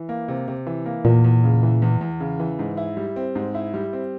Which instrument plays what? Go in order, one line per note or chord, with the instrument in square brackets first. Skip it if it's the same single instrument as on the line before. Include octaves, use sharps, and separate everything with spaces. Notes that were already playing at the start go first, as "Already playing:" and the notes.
Already playing: [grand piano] E3
A#3
C3
C3
E3
A#3
[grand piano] E2 [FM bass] A#2
[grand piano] E2
C#3
E3
E2
E2
C#3
E3
G#2
E4
G3
C4
G#2
E4
G3
C4